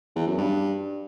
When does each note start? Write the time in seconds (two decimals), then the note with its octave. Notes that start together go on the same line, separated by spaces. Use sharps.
0.16 E2
0.27 F#2
0.38 G2